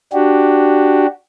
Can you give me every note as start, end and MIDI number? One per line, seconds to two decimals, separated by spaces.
0.13 1.06 62
0.13 1.06 66
0.13 1.06 67